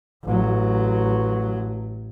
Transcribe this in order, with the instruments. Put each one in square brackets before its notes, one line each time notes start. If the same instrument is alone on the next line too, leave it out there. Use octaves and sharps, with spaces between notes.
[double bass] A1 F#3